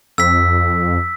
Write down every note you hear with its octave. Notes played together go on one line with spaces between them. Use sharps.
F2 E6 B6